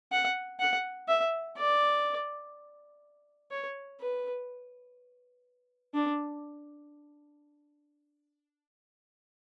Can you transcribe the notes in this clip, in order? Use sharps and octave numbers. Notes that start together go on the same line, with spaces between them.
F#5
F#5
E5
D5
C#5
B4
D4